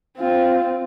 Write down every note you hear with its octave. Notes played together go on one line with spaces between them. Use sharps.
C4 F4